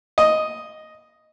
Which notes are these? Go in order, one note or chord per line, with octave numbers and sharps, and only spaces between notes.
D#5